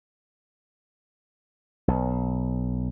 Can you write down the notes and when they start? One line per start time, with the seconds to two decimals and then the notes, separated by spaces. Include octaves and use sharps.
1.88 B1